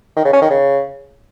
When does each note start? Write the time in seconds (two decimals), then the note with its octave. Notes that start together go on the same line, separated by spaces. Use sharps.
0.16 D#3
0.25 C#3
0.33 C#4
0.41 D#3
0.50 C#3